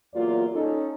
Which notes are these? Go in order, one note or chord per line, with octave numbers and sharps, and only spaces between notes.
E2 F#3 A#3 F4 D5
C#4 D#4 A4